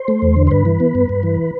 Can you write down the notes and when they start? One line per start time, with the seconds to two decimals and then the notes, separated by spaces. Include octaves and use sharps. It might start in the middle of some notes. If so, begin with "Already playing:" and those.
Already playing: C5
0.08 A3
0.22 E2
0.36 D3
0.47 C5
0.51 G2 B4
0.65 E3
0.80 B3
0.95 G2
1.09 G2
1.23 E3